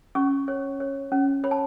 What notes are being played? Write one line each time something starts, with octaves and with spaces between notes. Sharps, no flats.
C#4 C#6
C#5
C#5
C#4
C#5 B5
A5